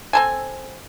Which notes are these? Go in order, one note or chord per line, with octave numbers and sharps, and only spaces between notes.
C4 A4 G#5